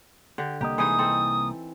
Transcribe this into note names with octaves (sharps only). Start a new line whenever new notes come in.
D3 G4
C2 A#3 G4 D#5
E3 G#3 D#4 D#6
C4 A4